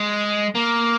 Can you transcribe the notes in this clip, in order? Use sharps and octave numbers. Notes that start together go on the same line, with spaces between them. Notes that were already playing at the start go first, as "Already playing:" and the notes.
Already playing: G#3
A#3